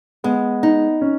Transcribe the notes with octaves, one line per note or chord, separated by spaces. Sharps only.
G#3 B3
D#4
C#4